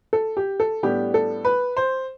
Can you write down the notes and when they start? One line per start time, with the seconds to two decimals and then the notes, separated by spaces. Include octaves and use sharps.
0.13 A4
0.37 G4
0.60 A4
0.83 A2 G3 B3 D4 G4
1.14 A4
1.45 B4
1.77 C5